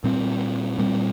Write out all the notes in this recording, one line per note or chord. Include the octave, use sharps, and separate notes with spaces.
A#2 G3 C4
A#2 G3 C4